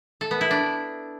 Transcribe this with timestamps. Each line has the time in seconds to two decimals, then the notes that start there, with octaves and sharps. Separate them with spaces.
0.21 A4
0.31 B3
0.41 E4
0.51 D4